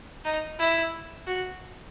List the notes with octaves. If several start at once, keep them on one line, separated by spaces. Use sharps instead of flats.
D#4
E4
F#4